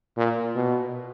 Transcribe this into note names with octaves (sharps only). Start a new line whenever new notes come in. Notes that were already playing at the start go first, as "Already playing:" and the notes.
A#2
B2